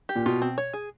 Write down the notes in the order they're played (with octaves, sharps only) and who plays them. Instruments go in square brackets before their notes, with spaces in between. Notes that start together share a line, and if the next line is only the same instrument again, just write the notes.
[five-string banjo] G4
[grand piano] A#2
[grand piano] B2 [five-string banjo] F4
[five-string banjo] C4
C#5
G#4